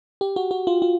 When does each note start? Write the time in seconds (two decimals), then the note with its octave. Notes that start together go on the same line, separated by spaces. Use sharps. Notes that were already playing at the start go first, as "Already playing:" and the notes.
0.21 G4
0.36 F#4
0.51 F#4
0.67 F4
0.82 F4